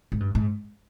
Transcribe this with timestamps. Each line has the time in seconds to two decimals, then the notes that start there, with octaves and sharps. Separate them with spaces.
0.12 G#2
0.20 G2
0.35 G#2